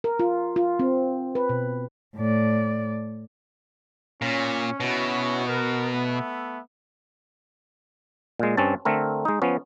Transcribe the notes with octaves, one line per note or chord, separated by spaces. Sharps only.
A#4
F4
F4
C4
B4
B2
A2 D5
A#2 C#4
B2 C#4 E4 F#4
B3 A#4
A3 B3 E5
A#2 G#3
G2 C4 C#4 A5
D3 A3 C4 A#4
G#3 D#4
F3 B3 C#4